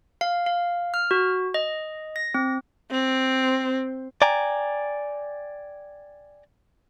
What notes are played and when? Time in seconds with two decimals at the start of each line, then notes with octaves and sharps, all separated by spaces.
0.21 F5
0.46 F5
0.94 F6
1.11 F#4
1.54 D#5
2.16 A#6
2.34 C4
2.91 C4
4.22 D5 G5 G#5 A#5